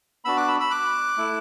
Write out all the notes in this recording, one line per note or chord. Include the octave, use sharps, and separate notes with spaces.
B3 D4 F#4 B5 E6
D6 F#6
B5 E6
B5 E6
D6 F#6
A3 E4